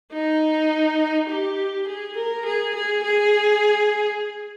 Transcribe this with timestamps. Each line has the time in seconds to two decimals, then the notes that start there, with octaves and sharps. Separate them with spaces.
0.13 D#4
1.29 G4
1.87 G#4
2.17 A#4
2.45 G#4
2.75 G#4
3.03 G#4